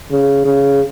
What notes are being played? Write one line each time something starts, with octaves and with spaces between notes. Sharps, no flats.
C#3
C#3